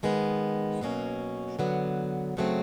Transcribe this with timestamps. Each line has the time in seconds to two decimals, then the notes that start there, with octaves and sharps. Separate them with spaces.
0.03 D#3 G#3 B3
0.81 B2 F#3 A#3 C#4
1.59 D3 F#3 B3
2.37 C#3 F#3 A3 C4